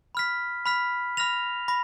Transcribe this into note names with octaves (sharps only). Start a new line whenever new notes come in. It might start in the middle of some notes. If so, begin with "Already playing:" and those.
B5 F6 B6
B5 F6 B6
B5 F6 A#6 F7
B5 A#6